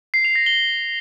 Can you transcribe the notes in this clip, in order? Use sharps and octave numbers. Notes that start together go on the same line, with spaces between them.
C7
F7
A#6
G7